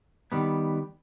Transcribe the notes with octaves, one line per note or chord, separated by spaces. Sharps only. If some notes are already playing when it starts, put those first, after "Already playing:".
D#3 G3 B3